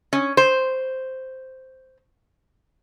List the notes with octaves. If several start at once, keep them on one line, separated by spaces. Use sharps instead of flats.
C#4
C5